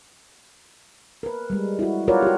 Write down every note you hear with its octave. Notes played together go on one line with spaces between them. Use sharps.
A#4 B4
G3 G#3
E4 F#4
F4 F#4 A#4 B4 C#5 D5
F#4 G4